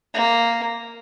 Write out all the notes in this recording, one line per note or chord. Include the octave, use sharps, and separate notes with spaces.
A#3